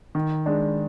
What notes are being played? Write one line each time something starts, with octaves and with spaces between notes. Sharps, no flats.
D#3
G#3 D4